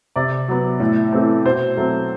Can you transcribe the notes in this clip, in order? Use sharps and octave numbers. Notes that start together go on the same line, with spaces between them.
C3 D5
F#3 B3
A2
E3 A3 C4
B2 C5
F#3 A3 C4